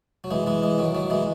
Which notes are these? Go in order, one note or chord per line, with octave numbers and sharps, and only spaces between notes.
F#3
E3 G#3
E3 G#3
E3 G#3
D#3 F#3
D#3 F#3
E3 G#3